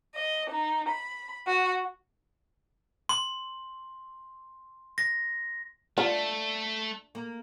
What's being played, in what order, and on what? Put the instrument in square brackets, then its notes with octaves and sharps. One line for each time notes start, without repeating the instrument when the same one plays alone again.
[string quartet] D#5
D#4
B5
F#4
[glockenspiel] C6
A#6
[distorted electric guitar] A3 [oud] D4 [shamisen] F4
[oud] A#3